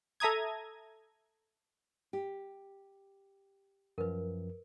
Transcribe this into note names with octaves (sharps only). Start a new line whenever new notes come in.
A4 E5 A#5 D#6 G#6
G4
F#2 F3 A#4 B4